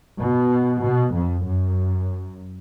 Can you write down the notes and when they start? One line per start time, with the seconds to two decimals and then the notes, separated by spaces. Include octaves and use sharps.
0.19 B2
0.82 B2
1.14 F2
1.45 F#2